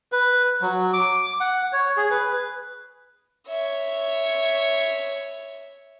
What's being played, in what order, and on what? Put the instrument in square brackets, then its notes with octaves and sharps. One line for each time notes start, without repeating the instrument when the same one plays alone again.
[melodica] B4
F#3
D6
F#5
C#5
G#4
B4
[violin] C#5 E5